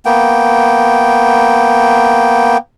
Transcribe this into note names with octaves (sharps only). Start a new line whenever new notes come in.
A#3 B3 G5